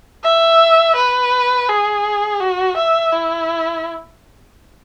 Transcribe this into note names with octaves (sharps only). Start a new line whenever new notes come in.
E5
B4
G#4
F#4
E5
E4